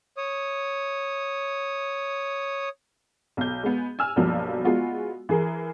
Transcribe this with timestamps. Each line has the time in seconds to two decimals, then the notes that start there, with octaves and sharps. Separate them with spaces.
0.17 C#5 D#6
3.37 B1 G6
3.63 G#3 B3
3.99 G#5 E6 F6
4.16 B1 G2 F3 F#3 A#3
4.65 G#3 B3 F4 F#4
5.29 E3 G#4 A#4